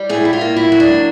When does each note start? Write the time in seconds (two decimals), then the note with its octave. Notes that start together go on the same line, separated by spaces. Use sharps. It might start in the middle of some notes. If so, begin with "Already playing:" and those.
Already playing: G3
0.09 A2 G#4
0.25 E4
0.33 F4
0.41 A#3
0.57 E4
0.72 F#3
0.80 D4